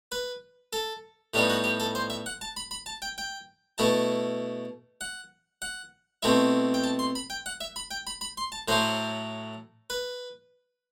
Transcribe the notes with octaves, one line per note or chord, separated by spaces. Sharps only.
B4
A4
A2 G3 B3 D#4 G4
F#4
G4
A4
C5
E5
F#5
A5
B5
B5
A5
G5
G5
B2 A3 E4 A5
F#5
F#5
B2 A3 C4 E4 E5
G5
A5
C6
B5
G5
F#5
E5
B5
G5
B5
B5
C6
A5
A2 F#3 A3 E4 C5
B4